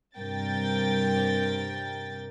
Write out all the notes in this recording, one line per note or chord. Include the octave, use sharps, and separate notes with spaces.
G2 C3 A#4 G5 A6